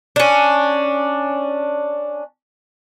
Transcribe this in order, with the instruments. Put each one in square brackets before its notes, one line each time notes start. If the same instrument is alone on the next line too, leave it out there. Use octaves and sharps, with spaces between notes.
[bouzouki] C#4 D4